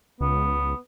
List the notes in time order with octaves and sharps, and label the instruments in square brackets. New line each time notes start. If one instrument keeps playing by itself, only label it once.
[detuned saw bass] C#2 [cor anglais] B3